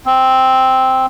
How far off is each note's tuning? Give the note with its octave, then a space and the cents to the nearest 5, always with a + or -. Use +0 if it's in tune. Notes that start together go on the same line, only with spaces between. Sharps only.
C4 +0